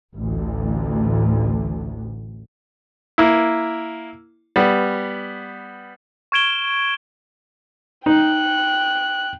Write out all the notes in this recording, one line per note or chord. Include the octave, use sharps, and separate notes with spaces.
A1 D2
A#3 E4
G3 B3
C#6 F6 G#6 D7 E7 G7
D#4 G5 F#6